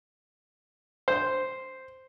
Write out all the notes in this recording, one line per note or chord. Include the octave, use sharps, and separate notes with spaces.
C5